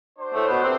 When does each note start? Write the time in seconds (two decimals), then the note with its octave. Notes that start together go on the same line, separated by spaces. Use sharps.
0.19 D4 F#4 C5
0.33 A2 A3
0.48 B2 B3
0.63 C3 C4